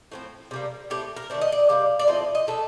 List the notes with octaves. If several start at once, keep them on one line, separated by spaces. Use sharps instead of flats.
A2 F3 C4
C3 G3 A#3
A2 A3 C4 G4
A#4
D#3 A3 C4 D5
D#5
D5
C3 G3 A#3 F5
D5
A2 F3 C4 D#5
D#5
A2 F3 A3 A4